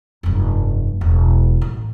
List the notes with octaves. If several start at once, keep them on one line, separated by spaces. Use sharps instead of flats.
F1 G2
E1
A1